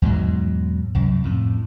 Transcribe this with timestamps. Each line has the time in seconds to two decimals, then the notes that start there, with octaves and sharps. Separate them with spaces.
0.02 E2 G#2 B2 F#3
0.95 C2 F#2
1.24 F2 A2